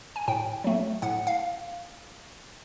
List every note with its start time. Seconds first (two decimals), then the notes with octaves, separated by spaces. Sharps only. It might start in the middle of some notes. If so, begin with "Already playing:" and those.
0.16 G#5
0.28 A2 G5
0.64 F#3 A3
1.02 A2 F#5
1.27 F5